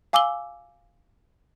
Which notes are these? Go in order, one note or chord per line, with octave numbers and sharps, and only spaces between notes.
F5 G#5 D6 E6 F#7 G7